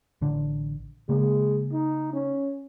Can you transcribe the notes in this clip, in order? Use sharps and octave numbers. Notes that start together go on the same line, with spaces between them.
A1 D3 D4
C#3 G#3 A#3
D#4
C#4